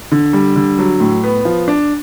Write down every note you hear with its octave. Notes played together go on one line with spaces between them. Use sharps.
D3
G3
D3
F#3
A2
B3
F3
D4